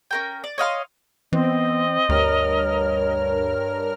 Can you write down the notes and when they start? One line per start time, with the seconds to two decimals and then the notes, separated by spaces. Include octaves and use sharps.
0.11 C#4 A#4 G5
0.44 D5
0.58 C#5 D#5 F5 C6
1.33 E3 B3 C4 D#5
2.09 D2 G2 A#4 C#5 F6